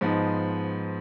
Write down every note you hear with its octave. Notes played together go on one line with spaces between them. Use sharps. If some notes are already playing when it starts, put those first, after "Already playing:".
G#2 F3 B3 D#4